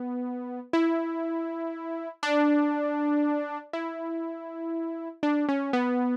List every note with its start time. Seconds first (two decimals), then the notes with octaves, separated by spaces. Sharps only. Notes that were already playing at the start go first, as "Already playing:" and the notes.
Already playing: B3
0.73 E4
2.23 D4
3.73 E4
5.23 D4
5.49 C#4
5.73 B3